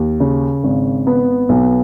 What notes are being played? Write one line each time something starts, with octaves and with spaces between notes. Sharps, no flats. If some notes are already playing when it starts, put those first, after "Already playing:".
Already playing: D#2
C#3
G#1
B3
B1